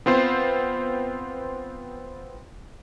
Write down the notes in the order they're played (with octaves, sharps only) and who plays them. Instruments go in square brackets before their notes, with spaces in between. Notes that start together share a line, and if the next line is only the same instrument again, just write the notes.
[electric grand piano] B3 C4 F4 C5